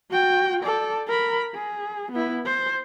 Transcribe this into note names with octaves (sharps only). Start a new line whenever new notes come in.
F#4 G5
A4 D5
A#4 B5
G#4
B3 E4
C5